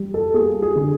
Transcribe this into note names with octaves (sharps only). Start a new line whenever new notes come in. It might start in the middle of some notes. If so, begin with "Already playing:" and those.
Already playing: G3
A4
A#3 G#4
G#4
D3